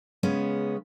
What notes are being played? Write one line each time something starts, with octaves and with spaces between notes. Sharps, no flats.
C#3 G#3 B3 C#4